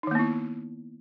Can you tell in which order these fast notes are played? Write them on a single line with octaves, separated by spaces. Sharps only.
D#4 D#3 A#3 B3 E4